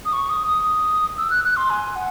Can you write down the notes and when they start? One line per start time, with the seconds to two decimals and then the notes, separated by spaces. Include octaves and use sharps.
0.05 D#6
0.13 C#6
0.29 D#6
0.47 D#6
1.18 E6
1.30 F#6
1.44 F#6
1.57 C6
1.70 G#5
1.96 F#5